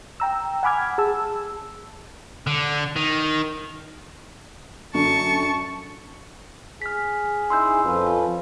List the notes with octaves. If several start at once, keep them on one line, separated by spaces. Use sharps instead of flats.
G5 A#5 E6
F#5 G#5 B5 D6 F6 G#6
G#4 A5 E6
D3
D#3
F#2 D3 A5 C#6
G#4 F6 B6
C#4 D#4 E4 C6 E6 G6
F2 F3 C#4 F4 B4